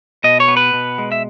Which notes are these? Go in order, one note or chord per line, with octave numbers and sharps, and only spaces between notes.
B2 D#5
C#5
B3
B4
B2
G#3
E5